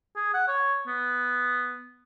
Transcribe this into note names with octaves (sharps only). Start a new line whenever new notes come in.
G#4
F#5
C#5
B3